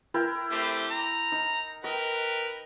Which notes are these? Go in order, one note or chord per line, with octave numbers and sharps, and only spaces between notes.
E4 A#4 G5
A3 C4 G4
A#5
D#4
A#4 B4 D#5 G5